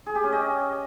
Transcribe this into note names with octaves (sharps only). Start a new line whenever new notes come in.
G#4
G4
C#4
D#5